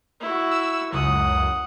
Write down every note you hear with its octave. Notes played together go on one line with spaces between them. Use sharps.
E4 F#4
E6
C#2 F#2 F#5 D#6